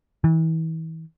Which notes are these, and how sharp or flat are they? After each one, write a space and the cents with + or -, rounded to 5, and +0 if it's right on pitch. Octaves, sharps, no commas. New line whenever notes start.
E3 -35